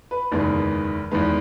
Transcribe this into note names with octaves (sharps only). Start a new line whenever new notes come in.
B4
F#1 E2 D#3 G#3 B4
E2 D#3 G#3 B4